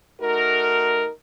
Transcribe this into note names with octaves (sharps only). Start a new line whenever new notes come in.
A3 D#4 F#4 A#4